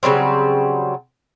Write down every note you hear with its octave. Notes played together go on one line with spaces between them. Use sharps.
C#3 F#3 G3 C4